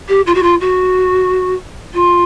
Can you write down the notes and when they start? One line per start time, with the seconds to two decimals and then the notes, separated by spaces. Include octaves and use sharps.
0.09 G4
0.26 F4
0.35 F#4
0.43 F4
0.60 F#4
1.94 F4